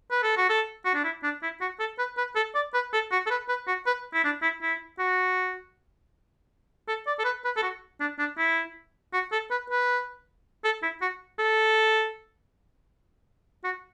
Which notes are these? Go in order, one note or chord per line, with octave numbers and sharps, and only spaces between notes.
B4
A4
F#4
A4
F#4
D4
E4
D4
E4
F#4
A4
B4
B4
A4
D5
B4
A4
F#4
A4
B4
B4
F#4
B4
E4
D4
E4
E4
F#4
A4
D5
A4
B4
B4
A4
F#4
D4
D4
E4
F#4
A4
B4
B4
A4
E4
F#4
A4
F#4